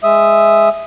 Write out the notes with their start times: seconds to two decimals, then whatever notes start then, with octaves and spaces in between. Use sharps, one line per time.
0.04 G#3 E5 D#6